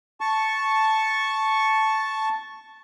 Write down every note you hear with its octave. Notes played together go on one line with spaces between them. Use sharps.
A5 C#6